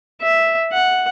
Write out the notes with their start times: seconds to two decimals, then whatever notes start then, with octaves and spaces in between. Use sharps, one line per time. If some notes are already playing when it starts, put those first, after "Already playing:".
0.22 E5
0.72 F#5